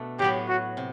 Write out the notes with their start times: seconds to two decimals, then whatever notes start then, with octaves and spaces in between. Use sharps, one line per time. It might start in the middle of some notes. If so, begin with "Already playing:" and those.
Already playing: B2 A3 D4
0.19 A2 F#3 B3 G4
0.48 F#4
0.77 C3